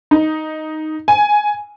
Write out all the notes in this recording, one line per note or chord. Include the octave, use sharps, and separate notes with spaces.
D#4
G#5